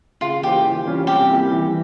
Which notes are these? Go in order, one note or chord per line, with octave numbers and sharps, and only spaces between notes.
C#3 F4
E3 A#3 F4 G4 C5
E3
G3 C#4 F4
C3 G4
G3 A#3 E4
E3